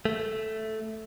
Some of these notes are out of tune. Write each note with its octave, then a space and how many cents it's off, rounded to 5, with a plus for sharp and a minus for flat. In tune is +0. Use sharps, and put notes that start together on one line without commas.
A3 -5